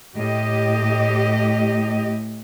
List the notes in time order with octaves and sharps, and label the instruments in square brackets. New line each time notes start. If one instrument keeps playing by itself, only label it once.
[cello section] A2 G4 D#5